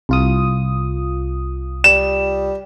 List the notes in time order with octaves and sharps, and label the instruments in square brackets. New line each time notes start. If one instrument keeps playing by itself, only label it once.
[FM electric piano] C2 F4 D#6
[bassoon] G3 [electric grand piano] E7